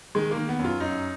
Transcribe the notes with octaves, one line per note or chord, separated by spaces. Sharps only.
D#3 G#3
A#3
D#3
B3
F#2
F4
F#2 D#4